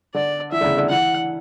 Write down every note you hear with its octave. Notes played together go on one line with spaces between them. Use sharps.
D3 D5
E3 E5
D3
C#3
D3
E3 F#5